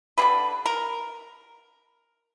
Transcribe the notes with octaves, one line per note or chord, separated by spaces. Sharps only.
D3 G3 A#3 B4
A#4